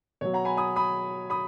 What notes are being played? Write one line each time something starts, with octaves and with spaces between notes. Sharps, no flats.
B2 F#3 C#5
F#5 A#5
G#5 B5
B5 D#6
B5 D#6
B5 D#6